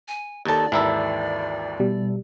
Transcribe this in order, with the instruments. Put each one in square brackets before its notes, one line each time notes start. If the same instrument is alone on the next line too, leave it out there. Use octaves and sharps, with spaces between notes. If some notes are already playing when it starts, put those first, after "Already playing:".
[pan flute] G#5
[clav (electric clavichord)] D#2 A5 [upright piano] D#4 A4 [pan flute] D5
[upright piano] G#1 D#2 A#5 [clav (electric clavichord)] E3 E4 A4
[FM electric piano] B2 G3